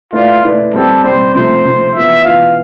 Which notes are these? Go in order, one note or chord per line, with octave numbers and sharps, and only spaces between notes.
A3 E4 F4 B4 D5
A3 E4 B4 D5
G3 C4 G4 A4
G3 C4 G4 C5
C3 F3 A3 C5
C3 F3 A3
E3 B3 F4 E5
E3 B3 F4 F5